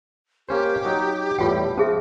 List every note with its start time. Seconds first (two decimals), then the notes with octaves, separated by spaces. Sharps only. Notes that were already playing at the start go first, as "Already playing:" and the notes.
0.49 A#3 C#4 G4 C5
0.85 F#3 D#4
1.39 E2 A2 G3 F4 G5
1.78 F3 C#4 G#4 E5